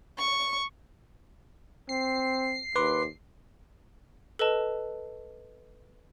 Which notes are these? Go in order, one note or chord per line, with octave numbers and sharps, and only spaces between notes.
C#6
C4 C7
D#2 B4 C6 D6
A4 B4 D#5 A5